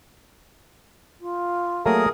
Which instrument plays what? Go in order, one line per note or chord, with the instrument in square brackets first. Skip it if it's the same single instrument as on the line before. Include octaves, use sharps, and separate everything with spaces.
[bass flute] F4
[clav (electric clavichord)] F#3 A3 A#3 [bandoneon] G#4 A#4 D#6